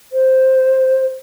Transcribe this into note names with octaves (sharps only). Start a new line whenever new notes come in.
C5